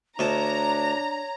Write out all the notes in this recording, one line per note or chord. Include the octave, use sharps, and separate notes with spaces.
D2 D4 C#5 D#5 A5 A#5